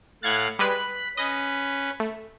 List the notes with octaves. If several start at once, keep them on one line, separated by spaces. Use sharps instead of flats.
A2 F5 F#5 F#6 G#6 A6
G3 G#3 B4 B5 F#6
C#4 B4 D#5
A3